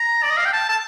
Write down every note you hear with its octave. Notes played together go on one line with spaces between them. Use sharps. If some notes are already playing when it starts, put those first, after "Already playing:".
Already playing: A#5
D5
D#5
F5
G5
A5
A5